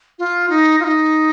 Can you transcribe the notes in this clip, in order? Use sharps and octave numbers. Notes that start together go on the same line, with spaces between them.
F4
D#4
F4
D#4